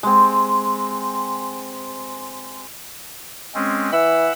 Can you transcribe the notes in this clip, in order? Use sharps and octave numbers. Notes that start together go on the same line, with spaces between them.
G#3 C4
G#3 C4 C#4
E3 F#5 B5 E6